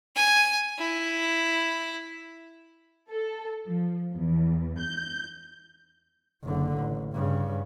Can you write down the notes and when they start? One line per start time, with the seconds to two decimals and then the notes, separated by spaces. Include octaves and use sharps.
0.16 G#5
0.79 E4
3.10 A4
3.67 F3
4.13 E2
4.78 G6
6.44 F#1 D3
6.78 A1
7.13 G2 C#3